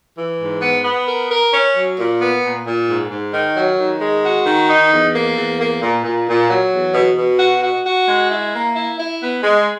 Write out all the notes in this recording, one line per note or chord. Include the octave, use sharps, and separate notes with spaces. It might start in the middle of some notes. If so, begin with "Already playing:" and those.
E3
G#2
B3
B3
A#4
A#4
C#4
F#3
A#2
B3
A#2
A#2
G#2
G#2
D#3
F#3
D#3
G#3
F#4
D#3
D#4
E2
A#3
E2
A#3
A#2
A#2
A#2
F#3
E2
B2
B2
F#4
F#4
F#4
G#3
E4
A#3
E4
E4
B3
G#3